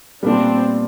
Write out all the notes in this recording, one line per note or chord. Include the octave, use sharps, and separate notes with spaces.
A#2 G3 B3 C4 D4